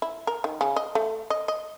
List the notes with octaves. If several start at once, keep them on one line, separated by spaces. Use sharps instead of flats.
E4
A#4
D#3
C#3
D#5
A3
D#5
D#5